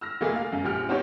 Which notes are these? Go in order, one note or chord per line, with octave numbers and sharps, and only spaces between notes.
E6 F6 A#6
F1 A3 A#3 G#4
F5
F#2
A#1 G4 F6
B3 C4 D#4 G4 C5 C#5